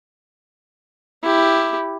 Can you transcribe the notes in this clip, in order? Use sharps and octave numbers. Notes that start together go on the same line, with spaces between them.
E4 G4